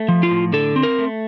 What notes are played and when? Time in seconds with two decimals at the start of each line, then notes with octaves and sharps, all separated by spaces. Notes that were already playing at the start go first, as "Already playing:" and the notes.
Already playing: A3
0.09 F3
0.23 F4
0.31 A2
0.53 D3 A4
0.76 C4
0.83 A#4
0.99 A3